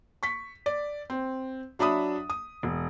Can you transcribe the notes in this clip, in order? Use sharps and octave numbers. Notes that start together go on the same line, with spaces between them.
C#6 B6
D5
C4
F#3 D4 E5 B5 D#6
D#6
E1